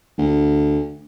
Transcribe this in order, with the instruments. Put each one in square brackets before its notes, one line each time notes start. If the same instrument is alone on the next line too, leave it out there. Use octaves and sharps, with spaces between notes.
[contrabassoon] D2